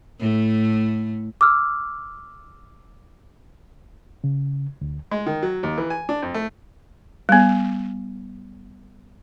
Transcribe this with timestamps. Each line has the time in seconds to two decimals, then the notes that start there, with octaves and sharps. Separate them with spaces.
0.20 A2 A3
1.41 D6 E6 F6
4.24 C#3
4.81 D2
5.11 G#3
5.26 D#3
5.43 F#3
5.63 D#2
5.78 E3
5.90 G#5
6.09 D4
6.22 F2
6.34 A3
7.29 G3 B3